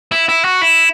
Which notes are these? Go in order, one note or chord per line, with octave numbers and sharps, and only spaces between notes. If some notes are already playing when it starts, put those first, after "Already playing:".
E4
E4
F#4
E4